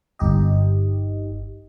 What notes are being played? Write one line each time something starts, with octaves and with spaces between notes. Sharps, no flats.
G1 D#4 G4 D#5